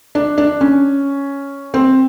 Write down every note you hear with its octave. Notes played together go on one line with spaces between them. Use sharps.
D4
D4
C#4
C4